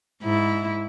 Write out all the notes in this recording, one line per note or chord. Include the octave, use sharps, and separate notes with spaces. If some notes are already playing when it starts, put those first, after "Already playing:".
G#2 E4